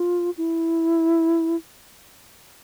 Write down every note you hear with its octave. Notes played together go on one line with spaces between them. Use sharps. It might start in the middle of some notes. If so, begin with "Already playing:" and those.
Already playing: F4
E4